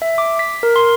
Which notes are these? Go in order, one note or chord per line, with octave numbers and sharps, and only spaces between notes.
E5
D6
B6
A#4
C6